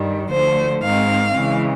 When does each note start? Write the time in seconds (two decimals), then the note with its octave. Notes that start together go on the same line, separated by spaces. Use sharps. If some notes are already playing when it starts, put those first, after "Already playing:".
Already playing: G2 D#3 G3
0.31 D2 D3 F3 A3 C5
0.83 G#2 D#3 G#3 C4 F5
1.35 C#3 E3 G#3